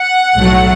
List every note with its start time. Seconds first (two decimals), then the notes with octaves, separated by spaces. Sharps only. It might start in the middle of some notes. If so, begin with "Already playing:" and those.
Already playing: F#5
0.37 B1 A2 F#3 A3